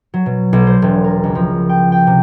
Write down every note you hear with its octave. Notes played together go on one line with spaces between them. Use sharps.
F#3
B2
B1
C5
E1
A#4
C#2
F3
G5
G5
C3